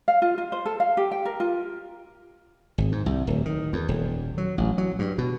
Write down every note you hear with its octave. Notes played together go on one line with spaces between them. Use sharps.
F5
F4
F4
C5
A4
F5
G4
G5
A#4
F4
G#1
G#2
C2
D1
D#3
E2
D#1
F#3
A1
F#3
G2
B2